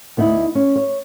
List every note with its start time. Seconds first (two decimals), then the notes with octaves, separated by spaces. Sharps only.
0.17 D2 B3 D#4 E4
0.55 C#4
0.76 C#5